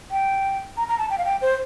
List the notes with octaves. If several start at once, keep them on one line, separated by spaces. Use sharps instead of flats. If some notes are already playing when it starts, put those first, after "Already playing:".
G5
A#5
A#5
A5
G5
F5
G5
C5